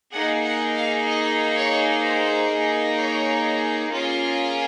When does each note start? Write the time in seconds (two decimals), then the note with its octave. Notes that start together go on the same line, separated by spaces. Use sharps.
0.12 A#3 D#4 G#4 F#5
0.44 F#5
0.76 F5
1.08 D#5
1.55 C#5
2.02 C5
2.98 C#5
3.93 A#3 C#4 F4 G#4